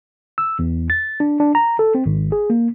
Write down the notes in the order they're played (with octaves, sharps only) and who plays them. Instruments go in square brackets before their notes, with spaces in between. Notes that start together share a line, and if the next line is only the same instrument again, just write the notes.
[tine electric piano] E6
E2
A6
D4
D4
A#5
A4
C4
G#1
G#4
A#3